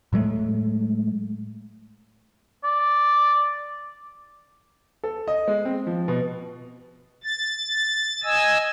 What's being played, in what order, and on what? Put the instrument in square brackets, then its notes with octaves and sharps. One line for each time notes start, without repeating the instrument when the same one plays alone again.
[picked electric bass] A2 F#3 G#3 A3
[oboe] D5
[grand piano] A4
D#5
G#3
C4
F3
B2
[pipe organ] A6
D#5 G#5 E6